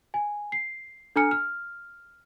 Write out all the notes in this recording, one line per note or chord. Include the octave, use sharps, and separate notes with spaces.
G#5
C7
D4 A4 G#5 A#5 F6 C#7
F6